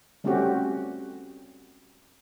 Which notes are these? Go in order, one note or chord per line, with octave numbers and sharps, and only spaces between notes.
G3 A3 C4 C#4 F#4 G4